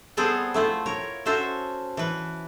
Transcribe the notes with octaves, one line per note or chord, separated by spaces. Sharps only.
G3 B3 C4 G#4 A4 C5
A3 E4 F4 C5
A#4 C#5
C#4 F#4 A4 C5 E5
E3 B4